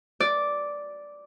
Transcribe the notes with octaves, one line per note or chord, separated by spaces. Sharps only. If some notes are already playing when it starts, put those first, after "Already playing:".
D5